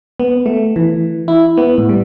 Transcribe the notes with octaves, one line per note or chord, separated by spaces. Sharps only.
B3
A3
E3
E4
B3
A2
G3